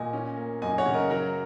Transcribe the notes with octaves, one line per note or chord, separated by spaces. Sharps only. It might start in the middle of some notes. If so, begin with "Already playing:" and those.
Already playing: A#2 D#5 G#5
C#4
A#3
F#2 D#5 G#5
C#5 F#5
C#3
A#4 D#5
F#3 F#4 A#4